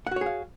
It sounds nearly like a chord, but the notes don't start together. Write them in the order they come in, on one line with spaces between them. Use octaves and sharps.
F#5 F#4 C#5 G#4 F5